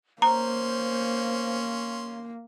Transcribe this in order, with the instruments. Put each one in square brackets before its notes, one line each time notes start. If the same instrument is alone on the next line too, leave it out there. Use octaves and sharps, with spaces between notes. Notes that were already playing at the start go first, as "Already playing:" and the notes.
[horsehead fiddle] A#3 [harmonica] C#4 C6 [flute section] C5 [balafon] A#5